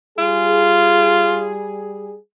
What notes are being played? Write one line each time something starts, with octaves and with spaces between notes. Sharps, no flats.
G3 F4 G#4